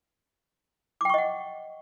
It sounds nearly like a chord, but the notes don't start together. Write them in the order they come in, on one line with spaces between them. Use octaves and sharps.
D6 G5 C#6 D#5 F#5